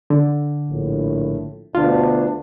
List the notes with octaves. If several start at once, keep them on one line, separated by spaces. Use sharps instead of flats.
D3
A#1 A2
D2 B2 D4 F4